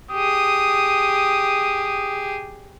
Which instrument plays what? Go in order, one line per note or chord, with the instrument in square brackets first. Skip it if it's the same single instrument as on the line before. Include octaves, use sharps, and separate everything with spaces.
[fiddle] G4 G#4 [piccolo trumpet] D#6